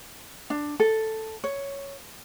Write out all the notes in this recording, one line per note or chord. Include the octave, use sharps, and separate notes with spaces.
D4
A4
C#5